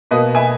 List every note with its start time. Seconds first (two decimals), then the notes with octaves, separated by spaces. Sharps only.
0.11 B2 A#3 B4 D#5
0.35 E5 G#5